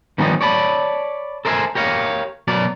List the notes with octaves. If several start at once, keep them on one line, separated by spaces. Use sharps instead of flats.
D#3 F3 G3 B3 C#4 D#4
C#5 D5 A5 B5
A4 A#4 C5 D#5 E5 G#5
G4 A#4 C#5 F5
B2 F#3 A#4 D5